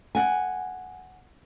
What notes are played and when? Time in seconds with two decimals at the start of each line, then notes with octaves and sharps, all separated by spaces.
0.15 F#5 G#5